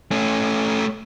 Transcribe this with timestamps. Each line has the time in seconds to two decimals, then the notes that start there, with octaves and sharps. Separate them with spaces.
0.11 A3 C#4